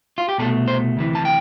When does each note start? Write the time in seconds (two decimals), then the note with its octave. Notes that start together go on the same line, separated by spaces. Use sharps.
0.18 F4
0.29 G4
0.38 C2 B2 A3 A4
0.68 C5
0.97 D2 C3 E3
1.15 A5
1.25 G5